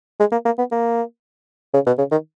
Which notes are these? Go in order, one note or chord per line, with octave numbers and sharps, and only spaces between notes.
G#3
A#3
A#3
B3
A#3
C#3
B2
C#3
D#3